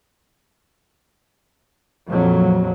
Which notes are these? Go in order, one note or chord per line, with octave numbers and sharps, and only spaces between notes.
A#1 F2 F#3